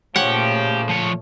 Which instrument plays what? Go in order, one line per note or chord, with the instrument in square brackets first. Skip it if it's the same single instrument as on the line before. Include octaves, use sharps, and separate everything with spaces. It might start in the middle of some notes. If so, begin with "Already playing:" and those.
[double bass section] A#2 A3 [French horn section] C#3 F3 [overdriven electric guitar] G4 [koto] C#5 F#5
[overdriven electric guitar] F3 C#5